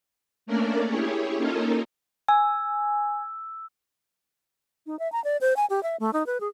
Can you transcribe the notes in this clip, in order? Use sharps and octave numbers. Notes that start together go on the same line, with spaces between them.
A3 A#3 C#4 D4 A#4 D5
E4 G4 G#4 C#5
A#3 C#4 D#4 F4 A4 A#4
G#5 E6
D#4
E5
A#5
D5
C5
G#5
G4
E5
A3
D#4
B4
G#4